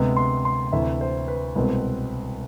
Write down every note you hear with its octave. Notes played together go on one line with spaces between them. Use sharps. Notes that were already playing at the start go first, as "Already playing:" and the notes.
Already playing: D2 C3 G#3 B3
C6
C6
D2 C3 E3 E5
C5
B4
C2 B2 G#3 C4